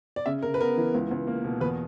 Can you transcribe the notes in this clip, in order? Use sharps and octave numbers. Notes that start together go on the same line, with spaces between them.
D5
C#3 E5
C#3 A#4
B4
B3 A#4
E3
C#2
C#2
A#3
B2
E2 B4